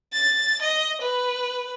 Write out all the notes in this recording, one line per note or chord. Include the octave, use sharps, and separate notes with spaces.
A6
D#5
B4